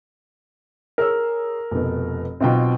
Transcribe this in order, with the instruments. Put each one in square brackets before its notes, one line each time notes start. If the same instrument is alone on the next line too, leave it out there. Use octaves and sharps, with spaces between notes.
[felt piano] G#4 C#5 E6 [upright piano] A#4
[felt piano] F1 B2
[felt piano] B1 F4 G5 [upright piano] B2 C4